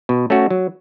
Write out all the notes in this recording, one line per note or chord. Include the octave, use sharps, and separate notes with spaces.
B2
A3 C#4 F#4
F#3